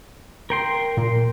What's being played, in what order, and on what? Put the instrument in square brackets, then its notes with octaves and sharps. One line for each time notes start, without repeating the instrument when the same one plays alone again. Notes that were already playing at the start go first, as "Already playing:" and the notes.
[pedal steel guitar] A#4 G5 C6
[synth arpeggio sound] A#2